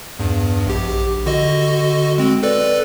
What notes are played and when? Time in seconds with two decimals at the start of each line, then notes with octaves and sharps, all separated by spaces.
0.19 E2 G2
0.67 A#1 G4
1.26 D3 F#4 D#5
2.18 G#3 C4
2.43 A4 B4 D5